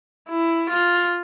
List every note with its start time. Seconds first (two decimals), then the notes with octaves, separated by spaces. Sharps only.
0.29 E4
0.70 F4